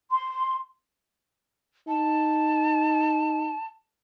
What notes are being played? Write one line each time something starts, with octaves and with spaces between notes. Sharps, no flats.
C6
D#4 A5